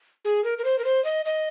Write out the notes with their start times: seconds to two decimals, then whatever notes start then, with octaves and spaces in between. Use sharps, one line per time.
0.25 G#4
0.44 A#4
0.58 A#4
0.64 C5
0.79 A#4
0.85 C5
1.04 D#5
1.25 D#5